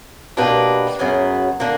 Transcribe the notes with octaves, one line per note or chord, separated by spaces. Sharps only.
B2 A#3 D4 G4 B4
F#2 C#3 F#3 B3
D3 A#3